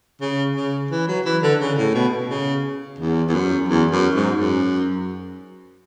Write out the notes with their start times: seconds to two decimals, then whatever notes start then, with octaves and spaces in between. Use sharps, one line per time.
0.21 C#3
0.56 C#3
0.91 E3
1.08 F#3
1.25 E3
1.43 D3
1.61 C#3
1.78 A2
1.95 B2
2.30 C#3
2.99 E2
3.29 E2
3.34 F#2
3.69 E2
3.91 F#2
4.16 G#2
4.38 F#2